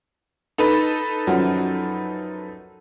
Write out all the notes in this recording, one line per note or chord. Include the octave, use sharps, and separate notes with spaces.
D#4 A4 B4
F#2 F3 F#3